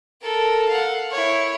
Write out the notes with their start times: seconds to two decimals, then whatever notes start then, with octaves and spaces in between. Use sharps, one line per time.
0.21 A4 A#4
0.69 F5 F#5
1.11 E4 C#5